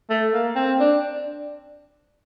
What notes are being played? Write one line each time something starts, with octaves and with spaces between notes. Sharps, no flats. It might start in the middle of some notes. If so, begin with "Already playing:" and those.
A3
A#3
C4
D4